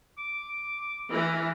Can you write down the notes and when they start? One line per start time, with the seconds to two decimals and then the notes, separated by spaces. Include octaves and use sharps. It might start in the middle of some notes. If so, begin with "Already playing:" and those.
0.18 D6
1.11 E3 A#4